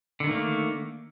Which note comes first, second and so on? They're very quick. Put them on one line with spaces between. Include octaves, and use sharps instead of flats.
D3 D#3 A3 A#3